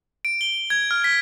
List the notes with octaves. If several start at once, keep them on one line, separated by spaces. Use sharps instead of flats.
D7
G7
G#6
F6
B6